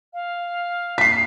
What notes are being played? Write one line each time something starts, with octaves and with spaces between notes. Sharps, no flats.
F5
B6 C7